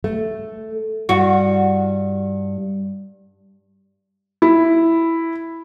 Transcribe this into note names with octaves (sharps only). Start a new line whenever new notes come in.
A3
G2 F#4
E4